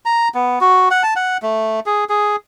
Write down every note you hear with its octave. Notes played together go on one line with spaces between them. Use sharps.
A#5
B3
F#4
F#5
A5
F#5
A3
G#4
G#4